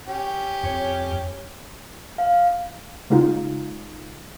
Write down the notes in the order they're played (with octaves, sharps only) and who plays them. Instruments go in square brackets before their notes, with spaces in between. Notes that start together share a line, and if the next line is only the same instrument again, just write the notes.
[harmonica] C#4 G4
[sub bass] F2 [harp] C#5
[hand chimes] F5
[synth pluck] C#3 G#3 D#4 F4